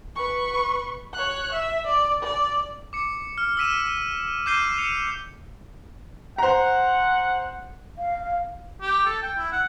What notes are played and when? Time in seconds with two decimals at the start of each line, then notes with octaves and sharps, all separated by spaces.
0.16 B4 C#6
1.13 C#5 F#6
1.52 E5
1.87 D5
2.23 D5
2.93 D6 C#7
3.38 F6
3.57 E6 F6 B6 D#7 E7
4.46 D6 F6 G6 C7 D#7 G7
4.78 C#7 F7
6.38 C5 F#5 A#5
7.98 F5
8.81 G4
9.06 A4
9.22 G5
9.38 E4
9.52 F#5